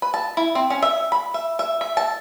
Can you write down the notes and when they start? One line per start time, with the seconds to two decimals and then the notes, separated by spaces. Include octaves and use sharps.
0.02 B4
0.14 A5
0.37 E4
0.55 C4
0.70 C#4
0.83 E5
1.12 B5
1.34 E5
1.59 E5
1.81 E5
1.97 A5